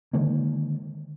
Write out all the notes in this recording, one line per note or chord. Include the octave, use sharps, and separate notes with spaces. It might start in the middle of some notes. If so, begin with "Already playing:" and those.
D3 D#3 G#3 A#3